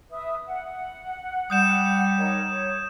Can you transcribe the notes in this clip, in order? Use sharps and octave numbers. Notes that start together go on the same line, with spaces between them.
B4 E5 D#6
F#5
G3 D#6 G6 E7
D#4 A#4 C#5
C#5